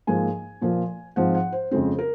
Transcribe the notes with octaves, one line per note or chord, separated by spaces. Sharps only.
G#2 F3 A#3 G#5
A#2 F3 A#3
G#2 F3 C4 F#5
F#5
C5
F2 C#3 G#3 C4 C5
A#4